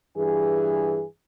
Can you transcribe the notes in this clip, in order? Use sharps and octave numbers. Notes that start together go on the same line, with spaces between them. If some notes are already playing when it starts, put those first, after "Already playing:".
G2 E3 G#4